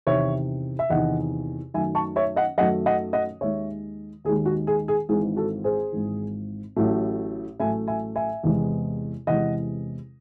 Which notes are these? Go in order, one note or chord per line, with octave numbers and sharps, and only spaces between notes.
E2 C3 D#3 C#5 E5
E5
E2 C3 D#3 D#5 F#5
F#2 D#3 F#3 A3 E5 G#5
A5 C#6
C#5 E5
D#5 F#5
F#2 D#3 F#3 A3 D#5 F#5
D#5 F#5
D#5 F#5
D#2 D#3 G#3 C#5 E5
D#2 D#3 G#3 G#4
F#4
G#4
G#4
G#1 G#2 E3 G#4
F#4 A4
G#4 C5
G#1 G#2 E3
A1 A2 F#3 A3
A1 A2 F#3 A3 E5 G#5
E5 G#5
E5 G#5
E2 C3 E3 G#3
E2 C3 E3 G#3 D#5 F#5